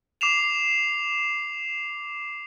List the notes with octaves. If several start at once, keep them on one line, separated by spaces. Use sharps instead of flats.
D6 C7 E7 F7